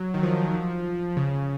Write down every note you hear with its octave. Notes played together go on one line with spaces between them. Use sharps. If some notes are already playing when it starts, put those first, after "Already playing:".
Already playing: F#3
D#3
F3
C#3